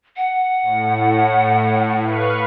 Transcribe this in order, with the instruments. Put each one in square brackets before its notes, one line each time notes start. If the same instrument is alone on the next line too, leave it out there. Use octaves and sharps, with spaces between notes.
[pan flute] F#5
[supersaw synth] A2
B4 F5 C#6